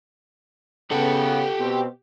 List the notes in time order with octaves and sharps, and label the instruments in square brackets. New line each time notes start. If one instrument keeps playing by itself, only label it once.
[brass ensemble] C#3 B3 [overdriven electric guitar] G4 F#5 [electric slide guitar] A4
[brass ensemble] B2 C4